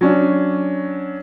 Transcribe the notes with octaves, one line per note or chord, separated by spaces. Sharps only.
F#3 C#4 D4